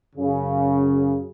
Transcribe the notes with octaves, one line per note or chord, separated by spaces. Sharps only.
F#2 C#3